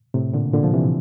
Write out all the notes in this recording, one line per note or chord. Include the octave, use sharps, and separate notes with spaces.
A2 C3
A#2 D3
A#2 D3
F3
C3 E3